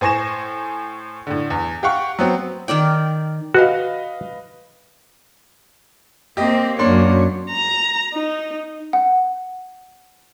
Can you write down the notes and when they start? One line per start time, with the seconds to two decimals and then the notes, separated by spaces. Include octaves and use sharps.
0.01 A2 C5 G#5 C#6 A#6 E7
1.27 A2 D3
1.50 E2
1.83 G4 F5 F#5 C#6
2.19 F#3 B3 C4
2.68 D#3 A#4 D5 G5
3.54 F#4 B4 D#5 F5
6.37 A#3 C4 G4 D#5
6.79 F#2 A#3 D4 C#5 C6
7.50 A#5
8.13 D#4
8.93 F#5